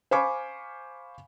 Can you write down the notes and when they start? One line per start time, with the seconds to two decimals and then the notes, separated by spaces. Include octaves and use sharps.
0.11 C5 F5 G#5 B5 C#6 D6